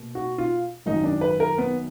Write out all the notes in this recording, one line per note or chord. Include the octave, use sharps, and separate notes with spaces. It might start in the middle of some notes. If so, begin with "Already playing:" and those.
Already playing: B2 A#3
F#4
F4
G#1 F#2 D#3 D#4
D4
B4
A#4
B3